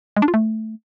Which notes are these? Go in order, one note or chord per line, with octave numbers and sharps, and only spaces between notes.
G#3
D4
F4
A3